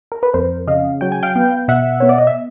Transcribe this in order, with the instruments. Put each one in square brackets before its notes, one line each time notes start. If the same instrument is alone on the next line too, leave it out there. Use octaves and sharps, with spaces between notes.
[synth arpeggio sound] A#4
B4
F2 A#4 C5
C#3 D#5 F5
F#3 G5
G#5
F5 G5
B3
B2 E5 F#5
B3 C#5
D5
D#5
E5